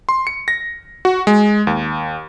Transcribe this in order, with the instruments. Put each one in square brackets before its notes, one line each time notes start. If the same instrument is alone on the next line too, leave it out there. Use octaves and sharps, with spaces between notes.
[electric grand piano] C6
C#7
A#6
F#4
G#3
D#2